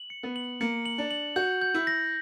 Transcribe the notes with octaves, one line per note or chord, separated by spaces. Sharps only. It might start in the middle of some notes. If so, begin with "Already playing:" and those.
Already playing: F#7
C#7
B3
F#7
A#3 C#7
F#7
D4
F#7
F#4 G6
G6
E4
A#6